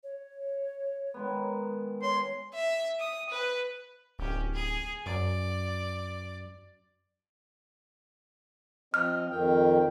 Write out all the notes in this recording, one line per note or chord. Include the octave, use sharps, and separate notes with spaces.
C#5
D#3 G#3 B3
C#5 C6
E5
D#6
B4
D1 C#4 G4
G#4
F#2 D5
F3 C4 D#5 F6
F2 D#3 G5